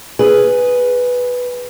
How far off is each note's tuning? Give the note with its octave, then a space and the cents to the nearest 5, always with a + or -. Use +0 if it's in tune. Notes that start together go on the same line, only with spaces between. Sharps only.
G#4 +0 B4 +0